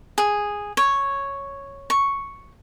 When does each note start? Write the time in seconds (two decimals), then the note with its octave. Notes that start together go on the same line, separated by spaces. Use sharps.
0.18 G#4
0.77 C#5
1.90 C#6